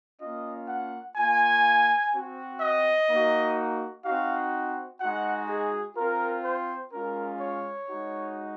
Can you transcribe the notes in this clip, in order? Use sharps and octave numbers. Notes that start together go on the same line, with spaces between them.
A#3 C#4 F4 D#5
F#5
A#3 F4 G#5
C4 F#4
D#5
A#3 D#4 F#4
C4 D#4 F#4 F5
G#3 D#4 F#4 F#5
G#4
C4 F4 A#4
C5
G#3 C#4 F4 A#4
C#5
G#3 D#4 F#4